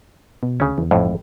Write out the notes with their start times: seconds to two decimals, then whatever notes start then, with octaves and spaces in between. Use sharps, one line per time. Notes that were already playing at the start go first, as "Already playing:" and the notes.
0.43 B2
0.60 D2 C#3 C#4
0.78 E2
0.91 G#1 F2 A2
1.05 G#1